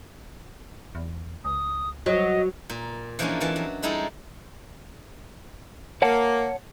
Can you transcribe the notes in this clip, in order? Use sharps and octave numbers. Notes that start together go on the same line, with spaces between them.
E2
C#2 D#6
F#3 D#5
A#2
E3 F3 G#3 A#3 C#4 D4
F2 E3 A5
F#3
G3 G#3 D#4 E4 G#4 A4
A#3 C#5 F#5 A5